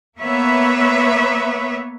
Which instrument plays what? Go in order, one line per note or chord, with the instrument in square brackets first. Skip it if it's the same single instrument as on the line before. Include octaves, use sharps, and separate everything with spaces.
[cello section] A#3 B3 B4 C#5 E5